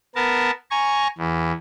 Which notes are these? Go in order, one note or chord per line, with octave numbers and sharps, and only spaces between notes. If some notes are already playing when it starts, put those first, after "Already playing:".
B3 A#4 A5
G#5 A#5 C#6
E2